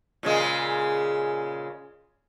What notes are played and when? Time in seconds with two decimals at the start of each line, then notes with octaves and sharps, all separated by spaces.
0.23 A#2 C#3 G#3